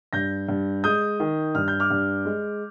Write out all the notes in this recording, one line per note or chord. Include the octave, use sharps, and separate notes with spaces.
G2 G6 A#6
G2
G#3 D#6 G6
D#3
G2 F6
G6
D6 F6
G2
G#3